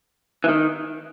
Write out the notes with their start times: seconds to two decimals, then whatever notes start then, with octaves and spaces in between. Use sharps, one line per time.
0.44 E3
0.49 D#3